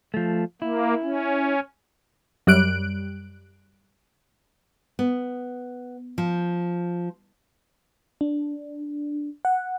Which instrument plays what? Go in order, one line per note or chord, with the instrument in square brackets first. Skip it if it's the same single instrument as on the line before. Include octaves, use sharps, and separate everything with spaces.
[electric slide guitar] F3 A3
[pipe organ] A#3 [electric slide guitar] E4
[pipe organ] C#4
[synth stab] F#2 G3 F#6 D7
[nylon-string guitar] B3
F3
[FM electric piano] D4
F#5